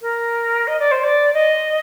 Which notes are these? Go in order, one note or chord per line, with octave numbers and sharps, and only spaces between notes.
A#4
D#5
D5
C5
D5
D#5